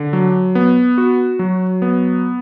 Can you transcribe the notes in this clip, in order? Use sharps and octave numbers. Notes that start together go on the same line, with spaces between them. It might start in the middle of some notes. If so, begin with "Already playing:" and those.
Already playing: D3
F#3
B3
F#4
F#3
B3